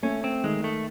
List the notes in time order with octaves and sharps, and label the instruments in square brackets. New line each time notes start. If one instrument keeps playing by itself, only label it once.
[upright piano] A3 [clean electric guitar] C#4
[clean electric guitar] C4
[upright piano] D#3 [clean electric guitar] G#3
[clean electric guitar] A3